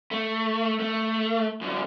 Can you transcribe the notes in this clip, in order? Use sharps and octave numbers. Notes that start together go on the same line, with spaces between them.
A3
A3
F#2 D3